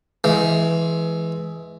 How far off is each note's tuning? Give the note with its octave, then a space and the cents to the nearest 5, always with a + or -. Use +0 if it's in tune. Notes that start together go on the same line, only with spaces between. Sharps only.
E3 +0 G#3 +20